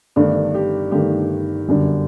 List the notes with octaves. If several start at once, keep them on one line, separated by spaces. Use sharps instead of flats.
G1 G2 D#3 A3 D4
G4
G1 G2 D#3 A3 G4
G1 F#2 D3 G3